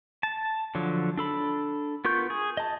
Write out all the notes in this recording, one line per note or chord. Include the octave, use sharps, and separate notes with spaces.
A5
D3 F3 F#3
D4 A4 B5
B3 F4 A#4 C#6 G6
G#4
D#5 A5